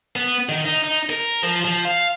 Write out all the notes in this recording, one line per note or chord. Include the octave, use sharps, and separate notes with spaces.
B3
D#3
D#4
D#4
A#4
F3
F3
F5